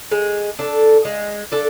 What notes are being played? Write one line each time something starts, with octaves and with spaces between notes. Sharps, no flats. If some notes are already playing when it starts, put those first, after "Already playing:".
G#3
D4 A4
G#3
D4 A4